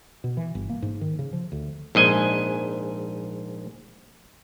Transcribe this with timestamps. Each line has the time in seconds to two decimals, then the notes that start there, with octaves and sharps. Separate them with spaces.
0.24 B2
0.37 E3
0.55 G1
0.69 A#3
0.82 G#2
1.01 D#3
1.19 C#3
1.33 F3
1.52 D2
1.95 A#1 G#2 D#5 G#5